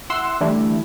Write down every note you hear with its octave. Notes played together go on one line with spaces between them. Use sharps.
E4 F#5 C6 E6
D3 E3 G3 A3 D4 E4